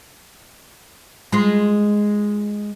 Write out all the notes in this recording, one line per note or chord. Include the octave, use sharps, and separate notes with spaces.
G#3 F4